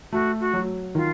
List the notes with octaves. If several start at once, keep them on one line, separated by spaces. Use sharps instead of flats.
A3 F#4
F#4
F#3
D#3 F4